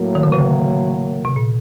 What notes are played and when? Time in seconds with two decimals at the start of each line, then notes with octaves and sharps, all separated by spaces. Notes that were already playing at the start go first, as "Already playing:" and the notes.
Already playing: A2 F#3 A#3
0.15 D#3
0.23 D3
0.32 C#3
1.25 C3
1.36 A#2